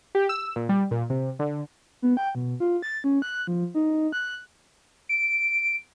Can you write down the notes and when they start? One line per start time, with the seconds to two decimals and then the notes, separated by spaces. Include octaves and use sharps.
0.15 G4
0.29 E6
0.56 A#2
0.69 G3
0.91 A#2
1.10 C3
1.39 D3
2.02 B3
2.17 G5
2.35 B2
2.60 F4
2.82 A6
3.04 C#4
3.22 F#6
3.47 F3
3.75 D#4
4.12 F#6
5.09 D7